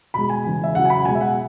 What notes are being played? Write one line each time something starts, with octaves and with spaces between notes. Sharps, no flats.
B2 G#3 B5
G#5
C#3 E3 G#3
E5
C#3 F#3 F#5
G#5
B5
B2 G#3 G#5
E5
F#5